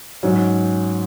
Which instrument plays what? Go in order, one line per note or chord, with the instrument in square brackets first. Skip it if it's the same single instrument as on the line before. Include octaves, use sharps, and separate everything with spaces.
[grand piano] G#2 F#3 C#4